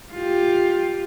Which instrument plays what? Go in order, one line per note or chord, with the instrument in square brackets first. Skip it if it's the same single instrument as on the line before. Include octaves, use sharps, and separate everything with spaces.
[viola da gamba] F4 G4